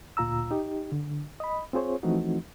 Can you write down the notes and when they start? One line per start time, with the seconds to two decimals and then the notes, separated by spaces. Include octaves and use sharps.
0.17 D2 A#2 F4 A#5 E6
0.51 D#4 G4
0.92 D3
1.40 D#5 B5
1.73 C4 F4 G#4 C5 C#5
2.03 E3 F3 A3 C4 D#4 F#4